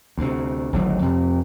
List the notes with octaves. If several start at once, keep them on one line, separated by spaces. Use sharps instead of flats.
D2 C3
G#1 D2 F#3
F2 C3